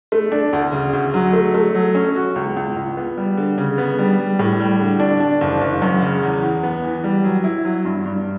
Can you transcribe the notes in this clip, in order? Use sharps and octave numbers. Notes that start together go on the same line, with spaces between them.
A3
D4
D2
C#3
D2
F#3
A3
A3
F#3
C#4
F#4
C#2
C#2
C#2
B3
G3
D3
C#3
B3
G3
G3
A2
G3
D3
D4
D4
F#1
F#1
F#2
C#3
E2
E2
B3
E3
G3
F#3
E4
F#3
G2
G2